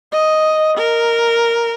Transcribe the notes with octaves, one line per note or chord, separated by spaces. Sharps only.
D#5
A#4